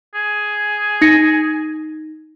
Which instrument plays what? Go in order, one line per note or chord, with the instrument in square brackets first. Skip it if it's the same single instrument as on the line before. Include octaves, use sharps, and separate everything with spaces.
[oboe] G#4
[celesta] D#4 A#6 C#7